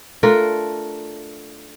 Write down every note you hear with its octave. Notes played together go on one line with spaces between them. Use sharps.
A3 D4 F4 A#4